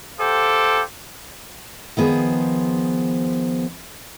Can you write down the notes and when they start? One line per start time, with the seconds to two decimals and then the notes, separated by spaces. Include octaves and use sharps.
0.19 G4 A4 C5 F5 G5 D6
1.97 D#3 F3 B3 G#4 C5